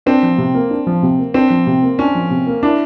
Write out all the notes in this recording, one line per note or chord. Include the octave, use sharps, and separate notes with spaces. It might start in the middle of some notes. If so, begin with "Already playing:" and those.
C4 D4
F3
C3
A#3
D4
F3
C3
A#3
C4 D4
F3
C3
A#3
C#4 D4
F3
C3
A#3
D4 E4